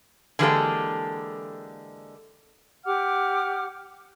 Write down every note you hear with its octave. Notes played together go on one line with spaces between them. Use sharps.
D3 E3 G#3 A#3 G4 A4
G4 F#5 D6 F6